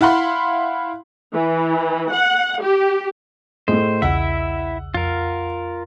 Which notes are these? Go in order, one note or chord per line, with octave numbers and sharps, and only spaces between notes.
E4 F5 F#5 B5 C6
E3
F#5
G4
A2 A3 G#4 C5 D#5
B1 E2 C#3 E4 E5 F#5 E6
F2 F4 A#4